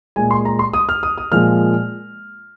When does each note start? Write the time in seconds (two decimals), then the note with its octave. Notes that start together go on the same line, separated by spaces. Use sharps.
0.16 A#2 G#3 G#5
0.31 C6
0.45 A#5
0.59 C6
0.74 D#6
0.89 F6
1.03 D#6
1.18 D#6
1.32 A#2 F3 G#3 F6